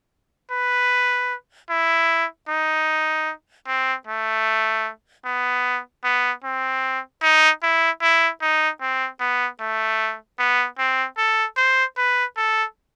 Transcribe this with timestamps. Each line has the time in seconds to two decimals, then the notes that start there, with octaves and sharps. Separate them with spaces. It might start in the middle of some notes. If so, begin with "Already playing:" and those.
0.51 B4
1.70 E4
2.49 D#4
3.67 C4
4.07 A3
5.25 B3
6.04 B3
6.44 C4
7.23 D#4
7.63 E4
8.02 E4
8.42 D#4
8.81 C4
9.20 B3
9.60 A3
10.39 B3
10.78 C4
11.18 A4
11.57 C5
11.97 B4
12.37 A4